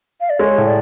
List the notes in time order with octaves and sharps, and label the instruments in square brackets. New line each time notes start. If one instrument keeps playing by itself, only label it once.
[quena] F5
D5
[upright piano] G#3 [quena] C#5
[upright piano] A2
[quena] D5